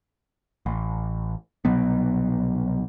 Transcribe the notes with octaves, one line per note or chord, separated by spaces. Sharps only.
A1
C2 B2 F#3 B3